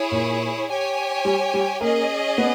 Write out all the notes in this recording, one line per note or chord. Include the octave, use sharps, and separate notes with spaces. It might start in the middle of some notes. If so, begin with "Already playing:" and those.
Already playing: E4 G#4 C#5
A#2
G4 C#5 G#5
G3
G3
A#3 C#4 G#4 D#5
B3